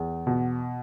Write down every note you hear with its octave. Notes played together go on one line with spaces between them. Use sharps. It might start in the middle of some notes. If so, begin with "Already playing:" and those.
Already playing: E2
B2